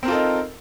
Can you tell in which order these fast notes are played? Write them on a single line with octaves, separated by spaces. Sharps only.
C4 A#4 F4 A4 D#4